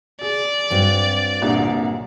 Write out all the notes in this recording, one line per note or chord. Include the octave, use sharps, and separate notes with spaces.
G#4 D5
G2 F#3 C4
C2 A#2 D3